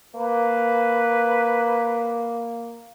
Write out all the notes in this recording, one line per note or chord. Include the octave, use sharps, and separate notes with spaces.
A#3 B4